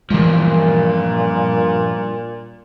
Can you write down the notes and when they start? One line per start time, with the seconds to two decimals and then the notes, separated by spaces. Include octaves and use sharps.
0.10 G2 A#2 E3 F3 G#3